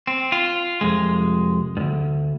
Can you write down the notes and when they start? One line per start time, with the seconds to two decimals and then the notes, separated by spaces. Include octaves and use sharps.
0.07 C4
0.32 F4
0.81 C2 F2 G#3
1.77 D2 G2